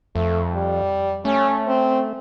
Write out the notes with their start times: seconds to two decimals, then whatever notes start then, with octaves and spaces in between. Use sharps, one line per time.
0.15 F2 A3
0.54 G3
1.25 A3 C#4
1.67 C4